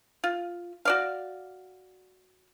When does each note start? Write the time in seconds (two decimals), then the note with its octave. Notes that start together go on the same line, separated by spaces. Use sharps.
0.24 F4
0.85 F#4 D5 F5